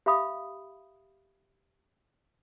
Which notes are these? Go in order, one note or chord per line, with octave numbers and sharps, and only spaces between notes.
G4 E5 F5 B5 D#6